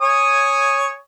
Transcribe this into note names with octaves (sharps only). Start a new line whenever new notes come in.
C#5 G#5 D#6